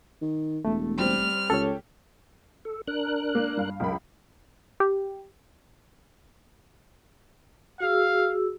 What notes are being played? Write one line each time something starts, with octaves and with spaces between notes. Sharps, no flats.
D#3
E1 A3
G3 C4 F6
C#2 G4 A4 C#5
A4
D4 A#4 F#6
A#3
G2 F5
C#2 F#2 A#4 B5
G4
F#4 G#4 F5 E6